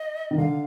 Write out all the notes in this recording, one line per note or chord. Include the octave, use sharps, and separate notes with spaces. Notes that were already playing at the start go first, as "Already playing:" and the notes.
Already playing: D#5
D#3
D3 F5